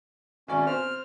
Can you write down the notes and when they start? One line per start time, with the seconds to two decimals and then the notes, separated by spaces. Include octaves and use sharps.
0.48 G#1 C#4 D5
0.67 C4 F6